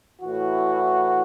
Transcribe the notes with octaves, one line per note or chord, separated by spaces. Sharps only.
A2 E3 F#4